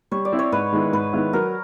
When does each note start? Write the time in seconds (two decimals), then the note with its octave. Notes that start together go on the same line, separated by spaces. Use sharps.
0.12 G3 C#5
0.25 D5
0.32 C4 E4
0.39 C#5
0.52 G#2 B4
0.73 D#3 G#3 B3 E4
0.93 G#2 B4
1.13 D#3 G#3 B3 E4
1.33 F#3 A#4